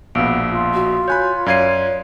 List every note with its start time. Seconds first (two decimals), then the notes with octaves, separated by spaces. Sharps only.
0.15 A#1 B2 B3 F5 E6 D7
0.51 F4
0.74 F#4
1.08 C#5 G#5 B5 C6 F#6 G6
1.46 F#2 C#5 D5 F5 G#6 C7 D#7